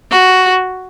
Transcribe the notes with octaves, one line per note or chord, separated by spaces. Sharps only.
F#4